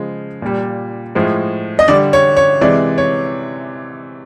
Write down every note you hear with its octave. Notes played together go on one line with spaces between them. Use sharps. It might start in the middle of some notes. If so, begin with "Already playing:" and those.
Already playing: C#3 F3 G#3
A#2 G3
A2 F3 G#3
D#5
D3 G3 D5
C#5
C#5
C3 E3 G#3 D5
C#5